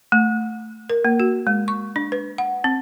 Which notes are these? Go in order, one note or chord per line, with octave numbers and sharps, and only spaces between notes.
A3
A#4
A#3
F#4
G#3
C#6
D4
B4
F#5
C4